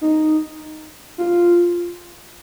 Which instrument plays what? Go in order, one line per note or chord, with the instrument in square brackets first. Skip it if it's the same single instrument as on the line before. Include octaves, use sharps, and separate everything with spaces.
[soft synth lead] D#4
F4